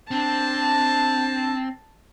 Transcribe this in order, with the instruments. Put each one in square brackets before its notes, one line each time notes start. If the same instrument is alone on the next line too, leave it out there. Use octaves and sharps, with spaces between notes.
[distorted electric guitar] C4 [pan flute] D4 [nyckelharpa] A5